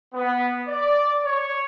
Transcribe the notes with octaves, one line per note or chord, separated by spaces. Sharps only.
B3
D5
C#5